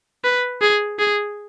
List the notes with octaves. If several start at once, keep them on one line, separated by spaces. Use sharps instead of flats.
B4
G#4
G#4